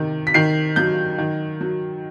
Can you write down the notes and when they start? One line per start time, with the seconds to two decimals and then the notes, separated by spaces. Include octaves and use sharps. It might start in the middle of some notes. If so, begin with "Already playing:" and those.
Already playing: C3 D#3
0.27 B6
0.34 D#3 C7
0.76 F#3 G6
1.18 D#3
1.61 F#3